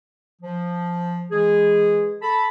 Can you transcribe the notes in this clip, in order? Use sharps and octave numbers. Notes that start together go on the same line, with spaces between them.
F3
E3 G#3 G#4
A4 A5 B5